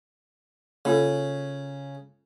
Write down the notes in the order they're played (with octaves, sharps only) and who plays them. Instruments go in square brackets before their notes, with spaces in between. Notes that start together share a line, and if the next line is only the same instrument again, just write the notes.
[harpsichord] C#3 [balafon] A#3 F4 A4